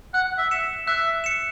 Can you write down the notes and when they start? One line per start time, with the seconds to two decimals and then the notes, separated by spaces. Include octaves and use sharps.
0.14 F#5 F#6
0.38 E5
0.51 C#7 E7
0.88 E5 F#6
1.24 C#7 E7